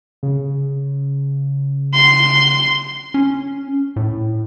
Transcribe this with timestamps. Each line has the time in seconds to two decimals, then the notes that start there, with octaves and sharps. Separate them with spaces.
0.23 C#3
1.93 C6
3.14 C#4
3.96 A2